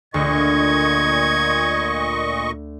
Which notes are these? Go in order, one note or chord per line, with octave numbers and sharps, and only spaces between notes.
D2 A#2 D#5 C#6 G#6